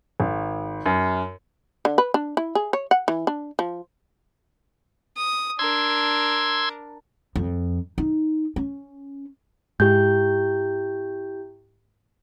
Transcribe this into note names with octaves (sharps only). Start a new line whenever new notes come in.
G#1
F#2
D3
B4
D4
E4
G#4
C#5
F#5
E3
D4
F3
D#6
D4 A#4 C6 E6 G#6
F2
D#4
C#4
G#2 E4 G4 G6